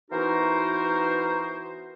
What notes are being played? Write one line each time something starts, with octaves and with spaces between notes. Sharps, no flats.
E3 B3 D#4 F#4 A#4 C5